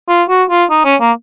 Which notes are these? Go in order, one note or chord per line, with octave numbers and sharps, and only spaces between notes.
F4
F#4
F4
D#4
C#4
A#3